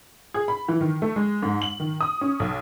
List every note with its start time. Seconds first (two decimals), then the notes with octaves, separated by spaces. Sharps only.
0.34 G#4
0.48 B5
0.68 E3
0.81 D#3
1.02 A3
1.16 G#3
1.43 G#2
1.62 F#7
1.80 D#3
2.01 D#6
2.21 C#4
2.40 B1